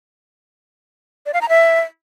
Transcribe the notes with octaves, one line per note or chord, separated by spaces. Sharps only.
D5
F5
A#5
E5